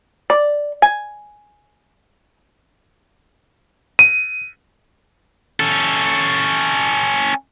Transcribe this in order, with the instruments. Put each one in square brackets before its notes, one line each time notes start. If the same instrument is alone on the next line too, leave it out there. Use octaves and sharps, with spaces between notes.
[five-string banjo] D5
G#5
[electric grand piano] D#7
[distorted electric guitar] C#4 A4